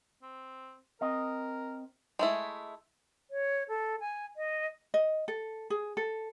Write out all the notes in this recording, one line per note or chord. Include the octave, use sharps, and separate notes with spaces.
C4
C4 A#4 D#5
G#3 A3 E4
C#5
A4
G#5
D#5
D#5
A4
G#4
A4